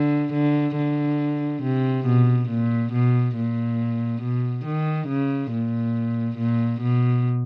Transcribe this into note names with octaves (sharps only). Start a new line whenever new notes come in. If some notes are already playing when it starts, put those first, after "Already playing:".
Already playing: D3
D3
D3
C3
B2
A#2
B2
A#2
B2
D#3
C#3
A#2
A#2
B2